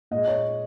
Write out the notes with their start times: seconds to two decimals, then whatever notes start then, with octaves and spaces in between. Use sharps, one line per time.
0.11 A#2 G#3 D#5
0.28 C#5